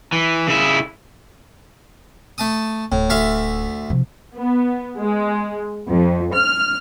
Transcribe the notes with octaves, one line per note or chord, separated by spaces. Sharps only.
E3
C#3 E4
A3 A5 D#6
D1 A2
D2 E5 F5
C3 F3
B3
G#3
F2
F6